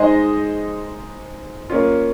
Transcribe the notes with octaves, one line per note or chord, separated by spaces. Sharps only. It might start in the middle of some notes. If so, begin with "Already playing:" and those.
Already playing: G#3 D#4 G#4 C5 D#5
A#3 C#4 F4